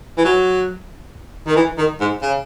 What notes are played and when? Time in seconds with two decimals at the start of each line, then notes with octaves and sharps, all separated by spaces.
0.17 E3
0.24 F#3
1.47 D#3
1.56 E3
1.78 D#3
2.00 G#2
2.22 C#3